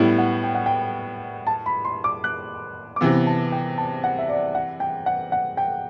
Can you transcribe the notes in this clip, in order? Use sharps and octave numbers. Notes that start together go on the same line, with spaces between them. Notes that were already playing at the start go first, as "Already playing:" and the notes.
Already playing: A2 G3 B3 E4
F#5
G5
F#5
G5
A5
B5
C6
D6
F#6
D6
C3 E3 B3 E6
A5
G5
A5
F#5
E5
D5
F#5
G5
F#5
F#5
G5